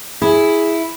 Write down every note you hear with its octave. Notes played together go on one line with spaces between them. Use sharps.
E4 G#4